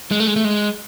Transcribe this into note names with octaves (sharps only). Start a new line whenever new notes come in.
G#3
A3
G#3
A3
G#3